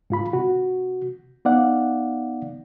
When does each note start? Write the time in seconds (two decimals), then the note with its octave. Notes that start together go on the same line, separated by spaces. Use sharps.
0.10 G#2 F4 B5
0.33 C3 F#4
1.45 B3 D#4 D5 F5 F#5